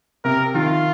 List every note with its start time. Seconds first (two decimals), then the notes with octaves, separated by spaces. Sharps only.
0.24 C3 A#4
0.55 D#3 F4